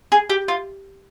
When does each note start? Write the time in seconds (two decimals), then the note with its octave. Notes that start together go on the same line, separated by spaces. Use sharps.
0.12 G#4
0.30 G4
0.48 F4